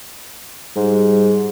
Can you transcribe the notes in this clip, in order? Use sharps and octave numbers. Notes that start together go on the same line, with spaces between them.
G#2 G3